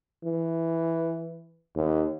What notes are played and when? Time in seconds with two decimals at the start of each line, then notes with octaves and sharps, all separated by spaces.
0.25 E3
1.76 D#2